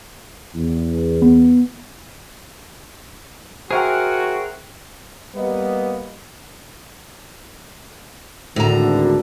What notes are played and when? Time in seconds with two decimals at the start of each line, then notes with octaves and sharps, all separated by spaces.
0.55 E2
1.22 B3
3.71 F#4 G#4 A#4 C5 E5 F#5 G5
5.36 G3 A#3 B3 D#5
8.56 G#1 D2 A2 D3 A#5